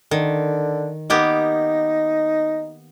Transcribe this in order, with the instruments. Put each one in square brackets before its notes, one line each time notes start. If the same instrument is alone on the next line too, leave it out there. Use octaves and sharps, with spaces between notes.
[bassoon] D3 [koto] D#3
[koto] A#3 B3 G4 [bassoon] D#4